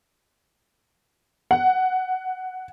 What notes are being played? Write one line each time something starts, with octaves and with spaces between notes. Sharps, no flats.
F#5